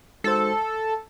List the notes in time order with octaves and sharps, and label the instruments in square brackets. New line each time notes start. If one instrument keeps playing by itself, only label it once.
[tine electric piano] G#3 D#4 F#4 C5 [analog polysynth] A4